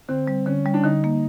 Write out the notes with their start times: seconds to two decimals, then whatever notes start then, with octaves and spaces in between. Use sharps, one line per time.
0.08 D3 C4
0.27 G3
0.46 D3 C#4
0.66 G3
0.74 D4
0.84 D3 D#4
1.04 A#3